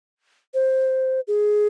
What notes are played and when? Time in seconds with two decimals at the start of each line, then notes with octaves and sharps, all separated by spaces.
0.54 C5
1.27 G#4